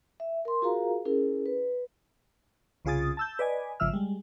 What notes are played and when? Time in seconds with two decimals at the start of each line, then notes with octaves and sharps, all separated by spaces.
0.20 E5
0.45 A#4 C6
0.62 F4 F#4 G#4 A#4 F5 A#5
1.05 C#4 E4 G#4 A#4
1.46 B4
2.85 C2 C#3 F4 G#4 D#6 A6
3.17 A5 E6 G6
3.39 B4 D5 D#5 G#5
3.80 G#1 C#3 F3 E5 E6 F6
3.93 G3 G#3